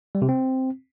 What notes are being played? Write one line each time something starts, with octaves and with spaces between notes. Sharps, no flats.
G3
C3
C4